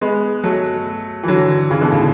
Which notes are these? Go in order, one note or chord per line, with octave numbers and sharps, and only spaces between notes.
G#3 B3
F#3 A3
E3
D3 F#3
C#3 E3
B2 D3
A2 C#3